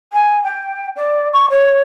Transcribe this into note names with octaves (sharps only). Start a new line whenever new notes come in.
G#5
G5
D5
C#6
C#5